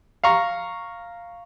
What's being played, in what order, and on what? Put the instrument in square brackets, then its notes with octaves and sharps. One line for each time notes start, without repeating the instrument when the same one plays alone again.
[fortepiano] F5 A#5 C#6